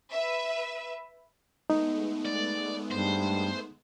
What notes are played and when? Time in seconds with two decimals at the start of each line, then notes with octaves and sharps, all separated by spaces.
0.13 B4 E5
1.70 G#3 A3 B3 D#4
2.26 D5
2.91 G2 C5